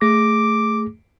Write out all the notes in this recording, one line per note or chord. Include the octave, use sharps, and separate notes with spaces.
A3 G#4 D6 A#6